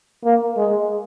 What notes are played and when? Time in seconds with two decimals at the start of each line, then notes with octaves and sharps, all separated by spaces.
0.24 A#3
0.57 G#3